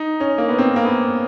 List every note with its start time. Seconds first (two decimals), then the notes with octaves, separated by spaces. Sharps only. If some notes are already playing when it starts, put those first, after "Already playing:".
Already playing: D#4
0.20 C#4
0.38 A#3
0.49 B3
0.59 C4
0.76 A#3
0.85 B3